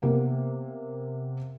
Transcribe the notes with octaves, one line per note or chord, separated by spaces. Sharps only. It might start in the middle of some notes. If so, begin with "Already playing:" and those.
C3 A#3 B3